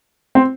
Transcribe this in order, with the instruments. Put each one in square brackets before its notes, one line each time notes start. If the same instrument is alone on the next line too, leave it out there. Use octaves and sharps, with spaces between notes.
[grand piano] C4